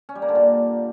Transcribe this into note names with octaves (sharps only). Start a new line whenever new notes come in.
C#4
G3
A#3
D3
A#2